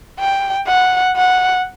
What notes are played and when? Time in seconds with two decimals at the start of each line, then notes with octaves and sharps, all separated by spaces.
0.20 G5
0.68 F#5
1.17 F#5